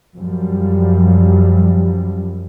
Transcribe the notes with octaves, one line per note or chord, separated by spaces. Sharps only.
F#2 F3 G3